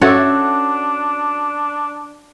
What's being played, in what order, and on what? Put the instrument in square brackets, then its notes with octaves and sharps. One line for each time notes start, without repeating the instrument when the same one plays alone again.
[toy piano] C#4 E5 E6 [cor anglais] D4 [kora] F#4 A4 C#5